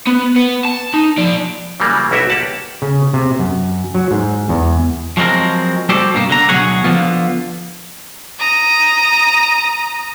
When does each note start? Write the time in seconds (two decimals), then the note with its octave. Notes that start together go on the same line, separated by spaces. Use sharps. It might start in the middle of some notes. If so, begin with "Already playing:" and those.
0.07 B3
0.36 B3
0.65 A5
0.94 D#4
1.18 F3 D5
1.80 C#3 E3 F#3 G3 A#3
2.11 B1 E4 F#4 G4 E5
2.30 A#3 G4 F#5 A5
2.82 C#3
3.14 C3
3.39 F#2
3.95 F#3
4.11 G#2
4.49 E2
5.17 F3 F#3 G#3 C4 A#4
5.89 G3 F#4 G4 A4 C5 D5
6.14 G2 B2 A#3
6.30 D3 A#5
6.49 D2 B2 F#3 G#4 C#5 F#5
6.84 D3 F3 B3 F4
8.39 A#5 D#6